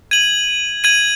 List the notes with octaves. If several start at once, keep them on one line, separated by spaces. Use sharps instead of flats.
G#6 D#7 F#7
G#6 D#7 F#7